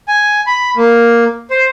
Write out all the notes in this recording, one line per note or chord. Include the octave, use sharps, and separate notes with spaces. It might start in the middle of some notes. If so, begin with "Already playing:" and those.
G#5
B5
A#3
C5